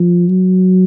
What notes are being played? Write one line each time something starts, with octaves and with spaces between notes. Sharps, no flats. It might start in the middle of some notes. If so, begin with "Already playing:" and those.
Already playing: F3
F#3